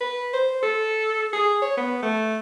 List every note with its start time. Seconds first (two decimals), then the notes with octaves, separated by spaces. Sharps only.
0.01 B4
0.33 C5
0.63 A4
1.33 G#4
1.62 C#5
1.77 B3
2.03 A3